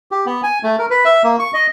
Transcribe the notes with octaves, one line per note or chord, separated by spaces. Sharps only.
G4
B3
G#5
A3
A#4
B4
E5
A#3
C#6
D#5